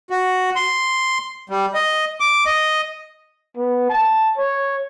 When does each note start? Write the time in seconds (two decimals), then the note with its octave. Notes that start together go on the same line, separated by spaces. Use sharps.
0.10 F#4
0.56 C6
1.49 G3
1.74 D#5
2.20 D6
2.46 D#5
3.57 B3
3.90 A5
4.38 C#5